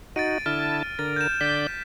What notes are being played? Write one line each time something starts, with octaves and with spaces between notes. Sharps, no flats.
D#4 F#4 A6 D7 D#7
D3 E4 A5 F6
D3 A#4 A6
G6 E7
D3 D5 G6 B6